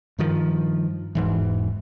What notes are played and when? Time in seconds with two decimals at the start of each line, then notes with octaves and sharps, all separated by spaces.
0.18 G2 D#3 F3
1.15 E1 G#2 E3